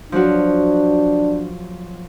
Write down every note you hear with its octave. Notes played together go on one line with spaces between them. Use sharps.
F3 F#3 D4 F#4